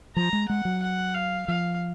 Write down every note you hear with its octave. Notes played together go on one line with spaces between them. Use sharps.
F3 A#5
G#3
G#3 F#5
F#3
F#5
F5
F3 F5